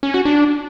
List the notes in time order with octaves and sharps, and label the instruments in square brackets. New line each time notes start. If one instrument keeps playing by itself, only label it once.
[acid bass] C#4
F#4
D4